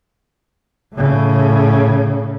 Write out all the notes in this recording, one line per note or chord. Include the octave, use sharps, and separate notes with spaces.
A2 C#3